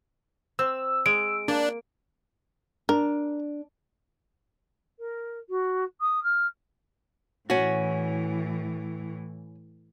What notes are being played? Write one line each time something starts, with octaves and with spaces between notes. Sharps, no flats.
C4 E6
G#3 D7
A#3 D4
D4 A#4
A#4
F#4
D#6
F6
A2 E3 C#4 F#4